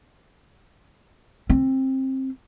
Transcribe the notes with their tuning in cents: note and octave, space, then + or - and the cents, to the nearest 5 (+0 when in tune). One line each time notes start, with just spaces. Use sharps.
C4 +20